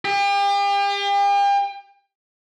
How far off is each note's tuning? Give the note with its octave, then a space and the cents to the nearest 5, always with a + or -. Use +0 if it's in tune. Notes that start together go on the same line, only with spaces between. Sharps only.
G4 +40